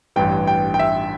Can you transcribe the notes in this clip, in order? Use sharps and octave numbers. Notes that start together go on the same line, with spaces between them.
A1 G2 E3 G5
G5
G5
E5